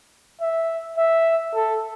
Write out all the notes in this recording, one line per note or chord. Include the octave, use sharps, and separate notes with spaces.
E5
E5
A4